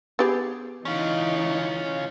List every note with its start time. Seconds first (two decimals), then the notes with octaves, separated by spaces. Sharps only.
0.19 B3 G4 G#4
0.85 E3 C#4 D#4 F4